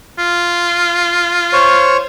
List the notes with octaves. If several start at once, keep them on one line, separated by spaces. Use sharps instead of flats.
F4
C5 C#5 C#6